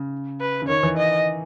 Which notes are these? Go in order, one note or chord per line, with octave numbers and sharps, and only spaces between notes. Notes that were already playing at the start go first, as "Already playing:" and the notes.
Already playing: C#3
B4
C#3
D#3 C#5
E3
D#5